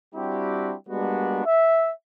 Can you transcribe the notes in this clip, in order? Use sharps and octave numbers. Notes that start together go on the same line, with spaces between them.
G3 C4 D4 E4 F#4 G4
G3 G#3 A#3 B3 D4 F#4
E5